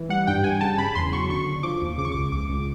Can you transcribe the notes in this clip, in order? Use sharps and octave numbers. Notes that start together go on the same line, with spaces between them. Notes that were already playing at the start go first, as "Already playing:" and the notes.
Already playing: E3
G3 F#5
G2 G5
G2 G#5
C#3 A5
C#3 B5
E2 C6
F#3 C#6
D3 C#6
D3
F3 D6
D#2
C#3 D6
C#6
C#2 D6
C#2 D6
C#2